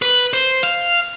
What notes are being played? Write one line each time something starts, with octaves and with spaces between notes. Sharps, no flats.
B4
C5
F5